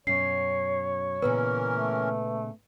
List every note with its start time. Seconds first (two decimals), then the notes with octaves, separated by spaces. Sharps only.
0.07 F#2 B2 C#4 C#5 C7
1.22 A#2 C#3 E3 B3 C#4 A#4 B4
1.70 A3